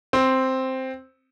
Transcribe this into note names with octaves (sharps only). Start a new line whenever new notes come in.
C4